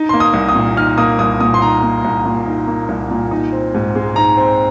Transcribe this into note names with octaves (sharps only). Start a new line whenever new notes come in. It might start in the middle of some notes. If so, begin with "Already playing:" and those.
Already playing: D#4
A#3 C6
D#6
C2
D#6
A#2
D#4 F6
A#3 D#6
C2 D#6
A#2 D#6
C6
D#4 A#5
A#3
C2
A#2
D#4
A#3
C2
A#2
D#4
C4
G#2
G#3
D#4 A#5
C4